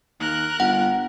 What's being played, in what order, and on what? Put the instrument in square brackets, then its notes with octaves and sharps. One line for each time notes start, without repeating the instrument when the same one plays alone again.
[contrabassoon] D#2 [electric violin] A#4 F#6
[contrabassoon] G1 [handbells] F#5